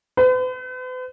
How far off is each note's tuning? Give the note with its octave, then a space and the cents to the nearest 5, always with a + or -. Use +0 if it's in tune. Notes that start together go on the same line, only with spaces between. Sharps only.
B4 +45